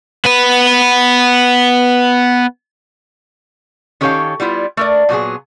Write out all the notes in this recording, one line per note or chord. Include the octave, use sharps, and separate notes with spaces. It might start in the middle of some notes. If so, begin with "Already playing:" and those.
B3 B4
D#3 C#4 G4 A4 C#5 F5
G3 B3 E4 F4
A3 A#4 D5
A#2 F#3 B3 G#4